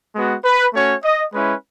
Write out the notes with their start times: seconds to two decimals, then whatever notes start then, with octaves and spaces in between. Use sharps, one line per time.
0.15 G#3 B3 F#4
0.45 B4
0.74 A3 C#4 F#4 C#5
1.04 D#5
1.34 G#3 C#4 E4 B4